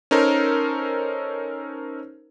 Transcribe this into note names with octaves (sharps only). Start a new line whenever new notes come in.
C#4 D#4 A4 A#4 C5